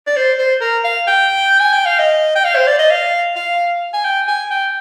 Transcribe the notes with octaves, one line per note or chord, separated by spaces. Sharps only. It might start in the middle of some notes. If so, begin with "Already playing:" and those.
D5
C5
C5
A#4
F5
G5
G#5
G5
F5
D#5
G5
F5
C5
D5
D#5
F5
F5
G#5
G5
G#5
G5